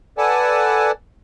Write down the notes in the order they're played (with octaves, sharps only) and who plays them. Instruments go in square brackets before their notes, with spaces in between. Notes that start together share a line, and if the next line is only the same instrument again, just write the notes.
[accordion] A4 B4 D5 F#5 G#5 A5